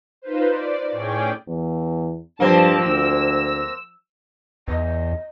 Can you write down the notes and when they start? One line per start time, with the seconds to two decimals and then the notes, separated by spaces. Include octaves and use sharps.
0.22 D#4 F4 B4 C5
0.50 D5
0.91 A2 C#4 G#4 D5 G5
1.48 E2
2.40 G2 F3 A#3 C4 A5
2.85 D2 E6
4.68 E2 D#5